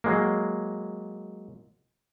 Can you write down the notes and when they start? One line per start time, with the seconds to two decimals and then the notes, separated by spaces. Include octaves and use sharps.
0.04 F#3 G#3 A#3